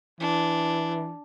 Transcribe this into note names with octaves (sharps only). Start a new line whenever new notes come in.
E3 D4